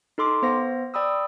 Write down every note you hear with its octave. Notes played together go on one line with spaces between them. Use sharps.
D#4 A4 C6 D6
B3 C5 F5 A#6
D5 G5 B5 D#6 E6